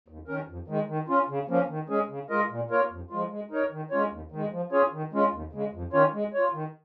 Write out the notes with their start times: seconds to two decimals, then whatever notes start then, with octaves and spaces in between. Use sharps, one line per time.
0.08 D#2
0.28 D#3 C#4 A#4
0.48 F2
0.68 D#3 G#3
0.88 D#3
1.08 C#4 F4
1.29 C#3
1.49 F3 A#3 C#4
1.69 D#3
1.89 G#3 C#4 G#4
2.09 C#3
2.30 G#3 F4 A#4 D#5
2.50 A#2
2.71 A#3 F4 A#4 C#5
2.90 F2
3.10 F3 G#3 F4
3.30 G#3
3.51 D#4 A#4 C#5
3.71 D#3
3.91 G#3 C#4 F4 C#5
4.11 D#2
4.31 D#3 G#3
4.52 F3
4.72 C#4 F4 G#4 C#5
4.92 D#3
5.13 G#3 C#4 F4
5.32 D#2
5.53 C#3 G#3
5.73 F2
5.93 D#3 C#4 F4 C#5
6.14 G#3
6.34 F4 C#5
6.54 D#3